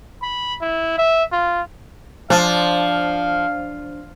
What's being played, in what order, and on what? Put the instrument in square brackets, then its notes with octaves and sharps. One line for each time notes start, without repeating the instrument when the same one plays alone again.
[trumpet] B5
E4
E5
F4
[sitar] F3 [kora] D4 [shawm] F5